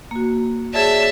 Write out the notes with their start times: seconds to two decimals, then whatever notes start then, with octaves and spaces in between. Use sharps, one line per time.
0.11 A#3 F#4
0.74 G#4 C#5 D5 E5 A5